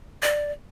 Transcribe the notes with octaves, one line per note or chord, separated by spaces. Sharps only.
D5